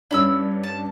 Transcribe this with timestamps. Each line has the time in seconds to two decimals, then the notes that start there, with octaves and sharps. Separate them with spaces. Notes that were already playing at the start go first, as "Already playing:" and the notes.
0.11 G2 C#4 D4 E4 B5 E6
0.63 A5